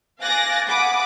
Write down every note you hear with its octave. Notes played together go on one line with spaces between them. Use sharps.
F5 G#5 D6 F#6 A6 A#6
F#5 B5 D6 D#6